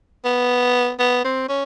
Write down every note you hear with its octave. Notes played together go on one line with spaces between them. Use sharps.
B3
B3
C4
C#4